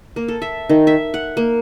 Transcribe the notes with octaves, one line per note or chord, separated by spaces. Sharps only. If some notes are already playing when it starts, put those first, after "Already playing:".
A#3
A4
E5
D#3
E5
F#5
A#3